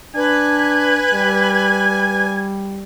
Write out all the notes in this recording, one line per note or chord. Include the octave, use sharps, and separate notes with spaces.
D4 B4 G#5
G3